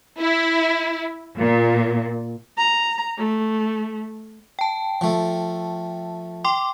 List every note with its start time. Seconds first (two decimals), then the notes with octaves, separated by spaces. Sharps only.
0.19 E4
1.38 A#2
2.58 A#5
3.19 A3
4.59 G5 A5
5.01 F3 A3
6.45 G5 C6 D6